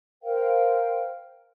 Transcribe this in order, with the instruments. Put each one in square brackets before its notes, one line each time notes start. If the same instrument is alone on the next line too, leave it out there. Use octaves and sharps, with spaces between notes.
[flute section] A#4 C5 F5 G5